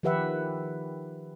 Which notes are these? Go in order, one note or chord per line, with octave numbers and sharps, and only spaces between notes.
D#3 F3 G4 B4 E5 F#5